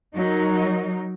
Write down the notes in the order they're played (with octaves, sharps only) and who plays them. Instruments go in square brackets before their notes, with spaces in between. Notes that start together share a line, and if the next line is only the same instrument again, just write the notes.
[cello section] F#3 D#4 A#4